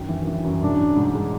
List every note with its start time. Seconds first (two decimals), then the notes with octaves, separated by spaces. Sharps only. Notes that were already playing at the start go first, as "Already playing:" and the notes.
Already playing: F#2 D#3
0.09 E3
0.27 E3
0.44 F#2
0.62 G#2 D4
0.79 E3
0.96 G#2
1.15 G#3